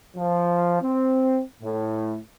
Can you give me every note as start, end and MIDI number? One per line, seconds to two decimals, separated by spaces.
0.16 0.81 53
0.82 1.41 60
1.62 2.18 45